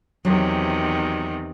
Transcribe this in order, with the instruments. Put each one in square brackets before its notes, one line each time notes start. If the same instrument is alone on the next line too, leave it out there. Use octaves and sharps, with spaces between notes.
[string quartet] E2 C3 D#3 [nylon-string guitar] F#3